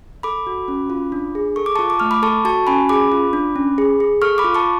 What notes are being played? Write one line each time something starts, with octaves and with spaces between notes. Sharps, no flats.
A4 B5 D6
F#4
C#4
F4
D4
G#4
A4 C#6
D6
F4 A5 C#6
D6
A3 F6
B5 D6
A4 A5 C#6
F#4 A5 C#6
C#4 G#5 B5
G#4 B5 D6
F4
D4
C#4
G#4
G#4
A4 C#6 F6
B5 D6
F4
A5 C#6